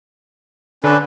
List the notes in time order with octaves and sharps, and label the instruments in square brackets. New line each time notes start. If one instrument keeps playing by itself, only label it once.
[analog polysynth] D3 [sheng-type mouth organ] C#4 D4 B4